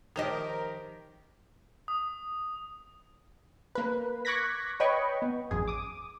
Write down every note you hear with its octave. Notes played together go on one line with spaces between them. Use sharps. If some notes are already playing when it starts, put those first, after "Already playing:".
D#3 F3 G4 A#4 C5 D#5
D#6
A#3 B4
C#6 D6 F#6 G#6 A#6 B6
B4 C#5 D#5 G5 B5 C#6
B3
A1 F#2 G#4
D6 D#6